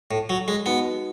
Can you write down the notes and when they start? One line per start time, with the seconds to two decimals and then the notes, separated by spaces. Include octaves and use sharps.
0.11 A2
0.30 F#3
0.48 G#3
0.66 B3 D#4 F#4 B4 D#5